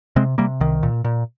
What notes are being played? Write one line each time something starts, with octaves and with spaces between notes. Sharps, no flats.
C3 G#3 C4
C3 G3 A#3
C2 D#3
A#2
A#2